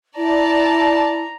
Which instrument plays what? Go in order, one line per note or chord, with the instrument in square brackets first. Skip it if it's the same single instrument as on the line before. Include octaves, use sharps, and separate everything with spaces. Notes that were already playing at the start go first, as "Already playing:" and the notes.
[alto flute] E4 [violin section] D5 A5 [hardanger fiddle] A#5